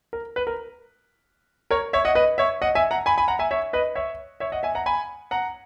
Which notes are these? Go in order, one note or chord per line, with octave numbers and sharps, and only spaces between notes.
A#4
B4
A#4
A#4 C#5
C#5 E5
D#5 F#5
B4 D#5
C#5 E5
D#5 F#5
E5 G#5
F#5 A#5
G#5 B5
G#5 B5
F#5 A#5
E5 G#5
C#5 E5
B4 D#5
C#5 E5
C#5 E5
D#5 F#5
E5 G#5
F#5 A#5
G#5 B5
F#5 A#5